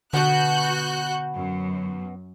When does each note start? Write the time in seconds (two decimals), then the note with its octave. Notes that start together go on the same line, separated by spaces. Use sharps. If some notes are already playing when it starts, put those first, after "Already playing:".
0.13 B2 D3 B3 F#4 F#6 G6
1.34 F#2